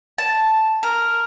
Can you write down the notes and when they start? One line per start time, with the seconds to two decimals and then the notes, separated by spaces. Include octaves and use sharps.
0.18 A5
0.83 A#4